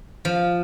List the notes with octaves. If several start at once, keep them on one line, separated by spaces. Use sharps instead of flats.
F3